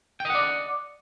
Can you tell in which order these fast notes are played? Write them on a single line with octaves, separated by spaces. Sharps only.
G5 D#5 F#5 D5